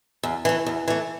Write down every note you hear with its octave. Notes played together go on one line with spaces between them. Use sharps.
E2
E3 A3
E2
E3 A3